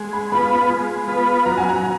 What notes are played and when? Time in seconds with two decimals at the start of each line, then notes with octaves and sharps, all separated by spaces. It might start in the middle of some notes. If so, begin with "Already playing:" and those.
Already playing: G#3
0.13 B5
0.32 B3 F4 B4 B5
0.51 B5
0.70 G#3
1.08 B3 F4 B4
1.46 F#3 A#5
1.58 G#5
1.69 A#5